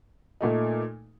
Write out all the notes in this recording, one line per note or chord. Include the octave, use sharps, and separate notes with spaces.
A#2 A3 D#4